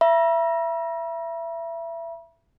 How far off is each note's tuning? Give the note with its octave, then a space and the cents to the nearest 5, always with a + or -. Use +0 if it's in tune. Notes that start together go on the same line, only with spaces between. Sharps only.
E5 +25 B5 -45